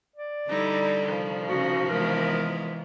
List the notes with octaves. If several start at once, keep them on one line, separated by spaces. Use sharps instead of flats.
D5
D3 G3 D#4 E4
C3 D#3 F3
C#3 F#4
E3 G#3 B3 A#4